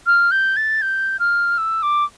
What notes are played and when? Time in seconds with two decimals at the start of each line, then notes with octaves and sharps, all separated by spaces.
0.06 F6
0.31 G6
0.56 A6
0.82 G6
1.19 F6
1.58 E6
1.82 D6